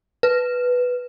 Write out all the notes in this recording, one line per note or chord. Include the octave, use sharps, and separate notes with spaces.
B4